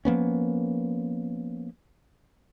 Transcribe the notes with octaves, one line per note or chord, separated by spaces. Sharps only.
F3 A#3 B3 C#4